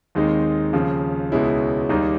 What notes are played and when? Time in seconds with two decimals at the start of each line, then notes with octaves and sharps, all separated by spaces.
0.15 D#2 D#3 G#3 C4 D#4
0.73 D#2 C#3 F3
1.32 C#2 B2 G#3 C#4 E4
1.89 D#2 D#3 G3 A#3 D#4